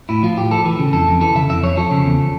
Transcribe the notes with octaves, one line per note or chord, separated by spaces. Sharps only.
A2 E4
F3 F4
A2 G4
F3 A4
E3 A4
C#3
F2 A4
F2
E3 A4
C#3 E5
F2 E5
F2 C#5
F3 A4
C#3
E2